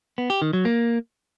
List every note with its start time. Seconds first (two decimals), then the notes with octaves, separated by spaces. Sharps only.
0.18 B3
0.30 G4
0.42 D#3
0.53 F#3
0.65 A#3